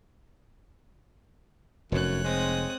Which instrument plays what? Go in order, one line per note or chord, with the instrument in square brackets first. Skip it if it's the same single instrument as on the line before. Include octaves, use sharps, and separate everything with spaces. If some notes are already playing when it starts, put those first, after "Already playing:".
[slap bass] F1 [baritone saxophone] F#2 [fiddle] C#5 F#6
[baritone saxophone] G#3 [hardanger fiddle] C4 D#6